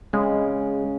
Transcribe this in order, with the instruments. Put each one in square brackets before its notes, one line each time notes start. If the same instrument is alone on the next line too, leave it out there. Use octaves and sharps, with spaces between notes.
[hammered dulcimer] C#3 [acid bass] G#3